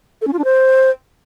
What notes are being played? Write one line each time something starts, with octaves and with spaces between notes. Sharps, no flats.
A4
C#4
F4
D4
C5